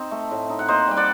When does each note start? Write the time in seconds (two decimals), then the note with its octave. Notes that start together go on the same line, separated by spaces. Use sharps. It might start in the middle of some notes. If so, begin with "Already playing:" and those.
Already playing: C4 D#4 C5 D#5
0.11 A3
0.31 A2
0.50 D#4
0.59 F#5
0.68 A#3 C5 D#5
0.87 G3 G5
0.97 D5 F#5